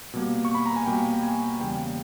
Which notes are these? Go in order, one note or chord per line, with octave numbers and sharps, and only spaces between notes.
B2 G3 A#3
C#6
B5
A#5
G#5
B2 G3 A#3 G5
G5
G#5
E2 C#3 G3 A#3 G5